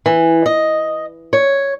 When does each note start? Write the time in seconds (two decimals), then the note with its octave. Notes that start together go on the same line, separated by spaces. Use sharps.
0.06 E3
0.46 D#5
1.33 C#5